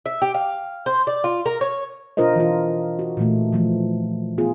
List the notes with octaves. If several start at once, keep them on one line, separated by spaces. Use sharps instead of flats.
E5
G4
F5
C5
D5
F4
A#4
C#5
B2 D4 F4 A#4 C5 D#5
E3 F4
F#4
A#2 E3 A3
E3 F3 A3
B3 F4 G#4